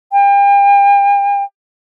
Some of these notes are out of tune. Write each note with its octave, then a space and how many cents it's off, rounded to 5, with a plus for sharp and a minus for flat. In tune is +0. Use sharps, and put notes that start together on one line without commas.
G5 +40